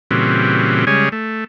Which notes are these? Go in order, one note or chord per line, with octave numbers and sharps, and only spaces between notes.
A#2 C#3 E3 G3 C4 F#4
C#3 G3 G#3 G#4 C#5
A3